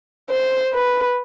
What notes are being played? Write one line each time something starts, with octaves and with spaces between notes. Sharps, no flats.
C5
B4